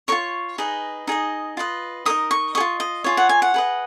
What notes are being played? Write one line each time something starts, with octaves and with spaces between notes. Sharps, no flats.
F4 A#4 C#5 C#6
D#4 G#4 B4 D#5
D#4 G#4 D#5
F4 B4 D#5
D#4 A#4 D#5 D#6
C#6
G#4 D#5 C#6
F4
D#5
F4 G#4 C#5
F#5
G#5
F#5
G#4 B4 D#5